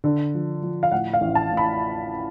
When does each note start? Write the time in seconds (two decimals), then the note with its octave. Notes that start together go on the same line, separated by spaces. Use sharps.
0.04 D3
0.34 F3
0.63 F3
0.83 F5
0.92 A2 F#5
1.13 F5
1.21 A1
1.35 A5
1.51 A2
1.57 B5